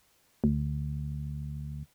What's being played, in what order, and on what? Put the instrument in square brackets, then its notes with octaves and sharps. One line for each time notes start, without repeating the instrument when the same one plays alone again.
[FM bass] D2